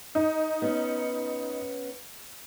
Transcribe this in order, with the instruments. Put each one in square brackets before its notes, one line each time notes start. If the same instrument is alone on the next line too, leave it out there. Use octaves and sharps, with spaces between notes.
[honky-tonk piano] D#4
[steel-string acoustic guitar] B3 C#4